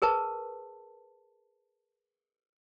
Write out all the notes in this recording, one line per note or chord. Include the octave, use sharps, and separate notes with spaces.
G#4 A#4 B4 A5